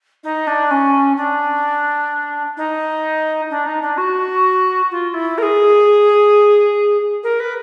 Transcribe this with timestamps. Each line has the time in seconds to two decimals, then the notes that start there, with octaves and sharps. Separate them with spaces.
0.24 D#4
0.47 D4
0.71 C#4
1.17 D4
2.57 D#4
3.50 D4
3.66 D#4
3.82 D4
3.98 F#4
4.91 F4
5.14 E4
5.38 A#4
5.42 G#4
7.24 A#4
7.40 B4